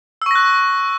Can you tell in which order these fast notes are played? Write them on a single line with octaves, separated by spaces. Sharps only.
E6 C#6 A#6 F#6